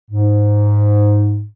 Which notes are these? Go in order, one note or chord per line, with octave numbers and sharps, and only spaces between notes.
G#2